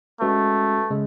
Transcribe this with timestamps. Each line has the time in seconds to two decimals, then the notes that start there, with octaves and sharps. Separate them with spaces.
0.20 G#3 A3 C#4 F#4 B4
0.91 C#3 G#3